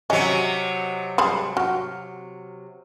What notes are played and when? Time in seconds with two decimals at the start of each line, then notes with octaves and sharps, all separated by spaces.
0.10 C3 F#3 C#4 D#5
1.18 G3 G#3 B5 C6
1.57 F#4 F6